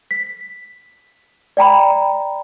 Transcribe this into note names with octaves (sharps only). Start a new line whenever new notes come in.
B6
D5 G5 A#5 B5